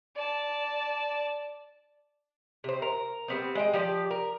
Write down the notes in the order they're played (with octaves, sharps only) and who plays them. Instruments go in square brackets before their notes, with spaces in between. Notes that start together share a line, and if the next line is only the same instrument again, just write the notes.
[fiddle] D5 A5
[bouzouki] C3 C5
A#4
G3 B3 C4
G#3 D#5 G5
F3 G4 D5
A#4